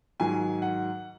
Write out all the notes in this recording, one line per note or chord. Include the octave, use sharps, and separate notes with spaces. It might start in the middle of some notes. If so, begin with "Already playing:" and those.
G#2 D#3 F#3 G#5
F#5